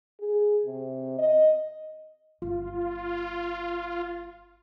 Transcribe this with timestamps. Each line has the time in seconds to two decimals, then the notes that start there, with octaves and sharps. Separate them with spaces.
0.20 G#4
0.66 C3
1.19 D#5
2.42 G1 F4